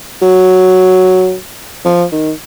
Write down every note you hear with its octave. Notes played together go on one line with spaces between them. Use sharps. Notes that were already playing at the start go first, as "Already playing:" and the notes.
F#3
F3
D#3